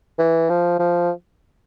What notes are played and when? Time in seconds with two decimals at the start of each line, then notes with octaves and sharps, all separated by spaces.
0.19 E3
0.50 F3
0.79 F3